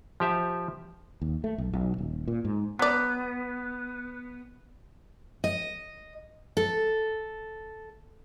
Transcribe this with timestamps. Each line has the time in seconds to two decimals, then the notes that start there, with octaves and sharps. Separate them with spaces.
0.20 F3 G4 E5
1.22 D#2
1.44 A3
1.58 B1
1.73 B1
1.98 D#1
2.28 A#2
2.45 G#2
2.79 F#3 B3 D5
5.44 D#5
6.57 A4